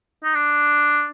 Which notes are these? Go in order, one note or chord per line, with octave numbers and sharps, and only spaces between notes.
D#4
D4